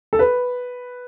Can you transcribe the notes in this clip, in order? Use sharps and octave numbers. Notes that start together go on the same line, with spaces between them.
A4
B4